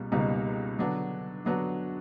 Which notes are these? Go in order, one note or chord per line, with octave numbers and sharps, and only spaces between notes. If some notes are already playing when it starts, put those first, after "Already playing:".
Already playing: C#2 B2 G3 A#3
C#2 B2 G3 A#3 D#4
D3 F#3 B3 D4 F#4
D3 F#3 B3 D4 F#4